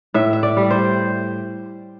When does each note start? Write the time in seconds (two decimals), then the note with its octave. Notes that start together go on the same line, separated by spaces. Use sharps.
0.14 A2 E5
0.33 E5
0.43 D5
0.57 G3
0.71 C5